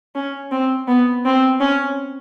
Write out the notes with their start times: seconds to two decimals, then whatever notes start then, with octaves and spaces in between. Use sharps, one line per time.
0.15 C#4
0.52 C4
0.88 B3
1.25 C4
1.60 C#4